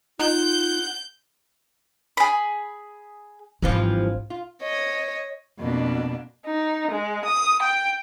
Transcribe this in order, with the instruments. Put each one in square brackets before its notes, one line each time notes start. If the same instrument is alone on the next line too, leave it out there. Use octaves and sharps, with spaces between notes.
[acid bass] D#4 [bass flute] F4 [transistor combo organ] F#5 [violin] G6
[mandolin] G#4 B5
[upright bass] G#1 [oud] G2 E3 F3
[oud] F4
[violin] C#5 D#5
[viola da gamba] F2 A#3 D4 [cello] B2
[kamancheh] D#4
G#3
D#6
G5